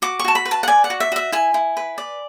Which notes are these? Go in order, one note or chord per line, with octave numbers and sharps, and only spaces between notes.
F#4 D6
C#6
F#4 A5
B5
B4
A5
F#5
D5 G#5
F#5
F#4
E5
F#4 E5
E4 G#5
E4
B4
D5